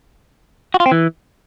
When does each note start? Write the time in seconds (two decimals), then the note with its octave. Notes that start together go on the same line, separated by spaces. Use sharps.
0.74 F#4
0.80 F4
0.86 C4
0.91 E3